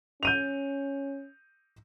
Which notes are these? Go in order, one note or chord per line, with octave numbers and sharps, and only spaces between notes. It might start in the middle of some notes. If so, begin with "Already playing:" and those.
C#4 G6 D#7 F7